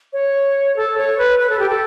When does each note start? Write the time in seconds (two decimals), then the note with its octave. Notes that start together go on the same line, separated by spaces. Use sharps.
0.13 C#5
0.76 A4
0.98 C#5
1.18 B4
1.40 B4
1.50 A4
1.59 G4
1.69 A4